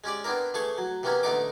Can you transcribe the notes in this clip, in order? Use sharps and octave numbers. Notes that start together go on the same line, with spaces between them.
G#3 C#4 G4 D5
B3 C4 D4 E4 A#4
E3 A3 G#4 A5 C#6
F#3
C3 E3 A#3 B3 C#4
A1 D3 A3 B3 D#4 D6